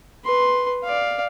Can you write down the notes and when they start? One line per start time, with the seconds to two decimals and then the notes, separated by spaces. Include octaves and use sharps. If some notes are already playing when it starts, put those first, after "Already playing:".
0.24 B4 C6
0.84 D5 F5